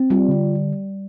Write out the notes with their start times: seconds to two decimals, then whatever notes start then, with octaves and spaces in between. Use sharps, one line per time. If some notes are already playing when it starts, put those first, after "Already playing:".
Already playing: C4
0.10 G3 F4
0.29 D3